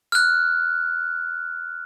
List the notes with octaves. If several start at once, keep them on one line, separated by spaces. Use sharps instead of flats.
F6 F#6